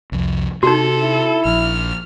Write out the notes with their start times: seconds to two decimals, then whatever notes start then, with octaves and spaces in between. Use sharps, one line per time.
0.12 C2 F2
0.63 C3 D#4 F#4 A4
1.03 E4
1.45 A#1 F6